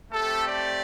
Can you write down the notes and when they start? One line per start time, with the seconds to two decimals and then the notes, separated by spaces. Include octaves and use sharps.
0.12 A3 C4 G4 A4
0.46 D5